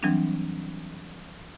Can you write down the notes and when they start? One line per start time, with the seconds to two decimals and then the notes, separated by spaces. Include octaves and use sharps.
0.03 E3 F#3 G3 C4 D4